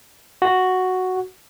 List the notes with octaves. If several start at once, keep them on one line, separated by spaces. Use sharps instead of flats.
F#4